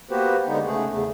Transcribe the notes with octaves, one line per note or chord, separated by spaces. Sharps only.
A#3 B3 F#4 G4 B4 C5
D3 G#3 B3 D#4
C#3 A3 G#4
E2 C#3 A3